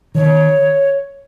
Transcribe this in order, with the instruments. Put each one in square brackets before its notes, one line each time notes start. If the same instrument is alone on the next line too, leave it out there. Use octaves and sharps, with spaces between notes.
[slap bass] D#3 [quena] C#5